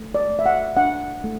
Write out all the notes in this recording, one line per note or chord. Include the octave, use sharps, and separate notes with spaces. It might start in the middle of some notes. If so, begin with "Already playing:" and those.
Already playing: A3
D5
A3
E5
F#5
D4 F#5
A3